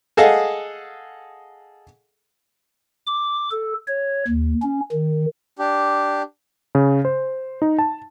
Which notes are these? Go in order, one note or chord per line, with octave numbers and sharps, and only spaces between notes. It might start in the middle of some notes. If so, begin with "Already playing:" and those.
G#4 A4 D#5 F5 F#5
D6
A4
C#5
D#2
C#4
D#3
D4 G4
C#3
C5
D#4
A5